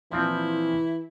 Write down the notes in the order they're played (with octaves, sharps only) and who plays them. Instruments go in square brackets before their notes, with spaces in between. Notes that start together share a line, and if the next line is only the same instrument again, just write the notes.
[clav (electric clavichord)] A#2 F3 C4 [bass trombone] E3 [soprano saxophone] E4